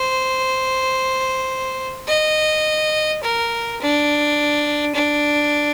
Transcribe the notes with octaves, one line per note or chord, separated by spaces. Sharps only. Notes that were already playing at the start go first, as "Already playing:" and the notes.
Already playing: C5
D#5
A#4
D4
D4